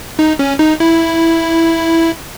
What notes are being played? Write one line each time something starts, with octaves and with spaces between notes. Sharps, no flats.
D#4
C#4
D#4
E4